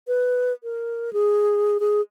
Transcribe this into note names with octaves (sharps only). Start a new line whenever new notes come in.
B4
A#4
G#4
G#4